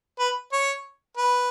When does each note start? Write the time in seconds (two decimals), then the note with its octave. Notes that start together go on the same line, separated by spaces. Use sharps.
0.19 B4
0.52 C#5
1.17 B4